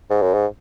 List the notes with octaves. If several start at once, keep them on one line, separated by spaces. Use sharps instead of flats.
G#2
F#2
G#2